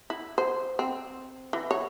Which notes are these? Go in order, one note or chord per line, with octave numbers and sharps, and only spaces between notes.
E4
C5
C4
E3
C#5